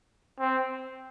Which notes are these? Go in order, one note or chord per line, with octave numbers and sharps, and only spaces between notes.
C4